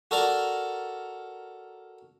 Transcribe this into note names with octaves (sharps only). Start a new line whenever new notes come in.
F#4 A4 A#4 D5 A#5